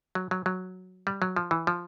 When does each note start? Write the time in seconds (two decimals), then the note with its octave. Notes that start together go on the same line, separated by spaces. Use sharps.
0.15 F#3
0.31 F#3
0.46 F#3
1.07 G3
1.22 F#3
1.36 F3
1.51 E3
1.67 F3